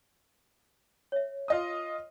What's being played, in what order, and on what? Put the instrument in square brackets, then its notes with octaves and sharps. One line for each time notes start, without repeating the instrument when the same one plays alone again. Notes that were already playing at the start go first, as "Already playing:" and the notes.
[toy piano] C#5 E5
[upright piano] F4 D#5 D#6